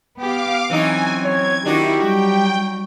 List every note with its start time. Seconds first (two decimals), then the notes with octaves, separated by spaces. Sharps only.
0.17 B3 G4 F5 D6
0.70 E3 F#3 C4 C#4 D#4 G#5
1.25 C#5 G#6
1.65 D#3 D4 E4 F#4 G4
2.00 F#3 G3 F#4 G5